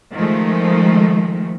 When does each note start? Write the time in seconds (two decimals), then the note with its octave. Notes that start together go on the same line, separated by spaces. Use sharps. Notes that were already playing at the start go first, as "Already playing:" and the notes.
0.13 D#3 F3 G#3 A3